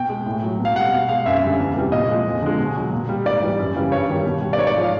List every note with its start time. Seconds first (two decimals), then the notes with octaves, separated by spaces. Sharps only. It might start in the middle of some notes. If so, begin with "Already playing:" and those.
Already playing: B2 G5
0.09 G#3
0.26 A2
0.43 F#3
0.59 B2
0.65 F5
0.76 G3 F#5
0.92 B2 F5
1.09 G#3 F5
1.26 F#2 E5
1.43 D3 G3
1.59 E2
1.76 C3 E3 G3
1.92 A#2 D#5
2.09 F3 G#3
2.26 F2
2.42 D3 F3 G#3
2.59 B2
2.75 F#3
2.92 A#2
3.09 G3
3.25 G#2 D5
3.42 E3 G3
3.59 F#2
3.75 C#3 E3 G3
3.92 G2 C#5
4.09 D#3 G3
4.25 B2
4.42 G3
4.53 D5
4.58 G#2 C#5
4.67 D5
4.76 F3 G#3
4.83 F5